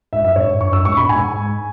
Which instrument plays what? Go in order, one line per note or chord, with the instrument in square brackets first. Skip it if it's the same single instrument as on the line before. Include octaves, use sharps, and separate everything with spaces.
[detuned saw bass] G#2 [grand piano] E5
[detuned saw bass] F#2 [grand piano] E5
[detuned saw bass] G#2 [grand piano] C#5
[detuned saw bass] G#2
[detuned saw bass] F#2 [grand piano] C#6
[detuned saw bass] F#2 [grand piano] E6
[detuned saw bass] G#2 [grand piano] C#6
[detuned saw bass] B2 [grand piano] B5
[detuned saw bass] G#2 [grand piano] G#5